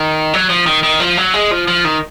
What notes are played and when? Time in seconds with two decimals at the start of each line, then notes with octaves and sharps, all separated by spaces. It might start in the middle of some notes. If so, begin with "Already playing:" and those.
Already playing: D#3
0.34 F#3
0.50 F3
0.67 D#3
0.83 D#3
1.00 F3
1.17 F#3
1.34 G#3
1.51 F3
1.68 F3
1.85 D#3